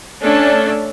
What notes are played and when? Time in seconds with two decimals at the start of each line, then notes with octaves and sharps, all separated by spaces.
0.21 A3 C#4 D4 A4